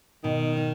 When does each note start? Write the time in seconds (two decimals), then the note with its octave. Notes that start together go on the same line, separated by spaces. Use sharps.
0.24 B2 D#3
0.57 D#4